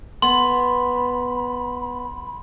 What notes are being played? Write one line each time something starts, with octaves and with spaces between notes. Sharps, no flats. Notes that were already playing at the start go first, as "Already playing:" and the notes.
B3 B5 C6